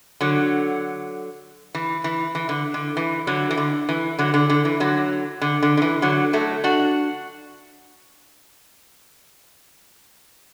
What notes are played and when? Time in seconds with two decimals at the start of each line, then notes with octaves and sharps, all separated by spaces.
0.21 D3 F#3
1.75 E3
2.04 E3
2.35 E3
2.49 D3
2.74 D3
2.97 E3
3.27 D3 F#3
3.51 E3
3.57 D3
3.89 E3
4.19 D3 F#3
4.34 D3
4.50 D3
4.65 E3
4.80 D3 F#3
5.42 D3
5.63 D3
5.77 D3
5.82 E3
6.02 D3 F#3
6.33 F#3 A3
6.64 D4 F#4